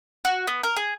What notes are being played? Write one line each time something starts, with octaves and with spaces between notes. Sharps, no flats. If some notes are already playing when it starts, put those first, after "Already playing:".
F#4
B3
A#4
G#4